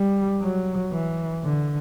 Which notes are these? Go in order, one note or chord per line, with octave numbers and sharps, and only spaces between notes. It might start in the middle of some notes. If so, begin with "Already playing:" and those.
Already playing: G3
F#3
E3
D3